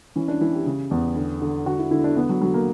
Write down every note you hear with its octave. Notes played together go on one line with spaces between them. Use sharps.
E3 C#4
D4
E3 E4
G4
C#3
E2
D3
D3
D3 F#4
E4
D3 E4
D4
D3 B3
F#3
D3 F#3
A#3